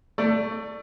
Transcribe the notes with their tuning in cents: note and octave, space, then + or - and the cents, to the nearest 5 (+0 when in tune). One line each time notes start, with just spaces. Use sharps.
A3 +20 D5 +0